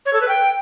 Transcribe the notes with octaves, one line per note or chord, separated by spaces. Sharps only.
C#5
A4
B4
G5